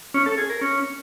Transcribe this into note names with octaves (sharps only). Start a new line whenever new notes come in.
C#4
A4
G#4
A#4
C#4